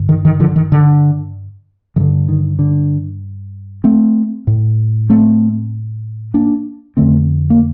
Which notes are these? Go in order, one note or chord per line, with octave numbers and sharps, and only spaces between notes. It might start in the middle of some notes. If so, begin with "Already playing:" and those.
Already playing: G2 D3
D#3
D#3
D3 F3
D#3
D3
G2 D3 D#3
D#3
D3
A3 C4
A2
A3 C4
A#3 D4
F2 D3 A3 C4
A#3